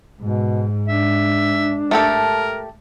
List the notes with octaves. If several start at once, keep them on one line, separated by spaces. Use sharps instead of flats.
G#2 B2
D4 E5
A3 G4 A4 A#4